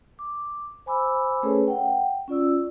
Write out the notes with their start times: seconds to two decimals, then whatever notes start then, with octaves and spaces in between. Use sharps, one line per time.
0.19 D6
0.86 C5 G#5 B5 D6 E6
1.43 A3 C#4 G#4 A4 B4 C#5
1.68 F#5 G5
2.28 C#4 F4 D5 E6